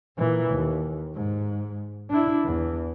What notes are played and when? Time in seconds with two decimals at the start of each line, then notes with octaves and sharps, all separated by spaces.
0.17 A#2 E3
0.50 D#2
1.15 G#2
2.10 D4 E4
2.45 E2